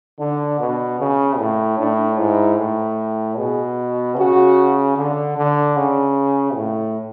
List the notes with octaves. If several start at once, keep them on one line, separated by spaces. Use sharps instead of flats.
D3 D4
B2
C#3
A2
A2 D4
G#2 E4
A2
B2 G#4
C#3 F#4
D3
D3
C#3
A2